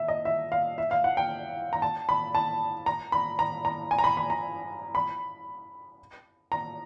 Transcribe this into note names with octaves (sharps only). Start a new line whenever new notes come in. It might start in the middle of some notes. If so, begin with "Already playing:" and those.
Already playing: E5
D#5
E5
F5
E5
F5
F#5
G5
A#5
A5
B5
A5
A#5
B5
A#5
A#5
G#5
A#5
B5
B5
A#5
B5
A#5